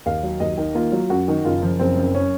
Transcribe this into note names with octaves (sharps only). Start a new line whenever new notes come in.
D#2 F5
F#3
D#2 D#5
D#3
A#3 F4
F#3
F#2 F#4
D#3
F#1 F4
F3
F#1 C4
F#2
C#4